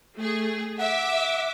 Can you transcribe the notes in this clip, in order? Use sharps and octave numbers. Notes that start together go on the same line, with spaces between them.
A3 G#4
E5 F#5 D6